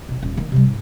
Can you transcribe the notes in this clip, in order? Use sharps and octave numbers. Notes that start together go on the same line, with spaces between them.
B1
D#1 F4
D#3 A#3
C3 G3
G#2